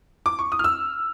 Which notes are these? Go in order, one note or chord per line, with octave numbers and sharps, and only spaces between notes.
D6
C#6
D#6
F6
E6